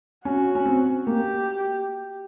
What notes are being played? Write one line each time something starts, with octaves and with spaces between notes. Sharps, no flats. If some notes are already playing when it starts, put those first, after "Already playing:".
C#4 F#4
C#4
C4
A#3 G4